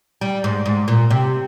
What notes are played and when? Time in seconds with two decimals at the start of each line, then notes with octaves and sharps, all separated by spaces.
0.21 G3
0.44 G#2
0.66 G#2
0.88 A#2
1.11 C3